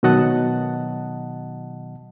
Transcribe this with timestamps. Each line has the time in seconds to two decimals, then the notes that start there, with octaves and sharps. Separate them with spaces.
0.03 B2 D#3 F#3 D#5 F#5 A5